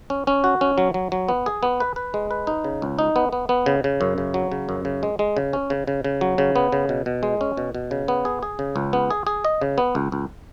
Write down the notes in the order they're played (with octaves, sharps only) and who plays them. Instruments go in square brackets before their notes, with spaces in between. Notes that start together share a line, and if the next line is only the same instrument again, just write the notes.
[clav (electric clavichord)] C#4
C#4
F#4
C#4
F#3
F#3
F#3
B3
G#4
B3
B4
B4
G#3
B4
D#4
C#3
C#2
D#4
B3
B3
B3
C#3
C#3
F#2
C#3
F#3
C#3
F#2
C#3
G#3
G#3
C#3
C#4
C#3
C#3
C#3
F#3
C#3
B3
C#3
B2
B2
G#3
C#4
B2
B2
C#3
B3
G#4
G#4
C#3
C#2
B3
G#4
G#4
D#5
C#3
B3
C#2
C#2